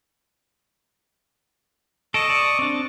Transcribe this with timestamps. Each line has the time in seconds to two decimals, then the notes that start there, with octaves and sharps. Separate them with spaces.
2.14 A4 D#5 C#6 D#6 D7 E7
2.30 D5
2.59 C4 D4